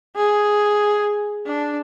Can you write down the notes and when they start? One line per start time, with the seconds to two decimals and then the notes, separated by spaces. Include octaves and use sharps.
0.16 G#4
1.46 D4